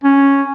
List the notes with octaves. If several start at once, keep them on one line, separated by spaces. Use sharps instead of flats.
C#4